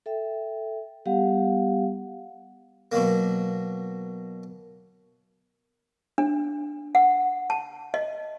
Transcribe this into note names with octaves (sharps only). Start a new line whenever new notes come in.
A4 E5 G5
G3 B3 G4 F5 F#5
B2 F#3 A#3
D4
F#5
A5
D#5